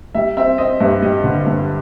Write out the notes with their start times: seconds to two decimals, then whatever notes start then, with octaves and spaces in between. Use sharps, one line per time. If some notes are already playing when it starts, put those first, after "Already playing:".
0.15 G3 E5
0.37 C4 E5
0.58 C4 D#5
0.80 G2 E5
1.02 G3 D#5
1.24 D3
1.46 G2